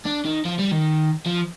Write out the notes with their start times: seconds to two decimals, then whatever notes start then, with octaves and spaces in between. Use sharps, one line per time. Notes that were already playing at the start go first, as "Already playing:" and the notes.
0.05 D4
0.25 D#3
0.45 F3
0.59 G3
0.72 D#3
1.26 F3